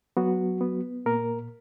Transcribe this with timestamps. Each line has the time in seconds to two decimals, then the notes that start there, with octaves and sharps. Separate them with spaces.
0.17 F#3 B3 F#4
0.61 B3
1.06 A#2 A#3 A#4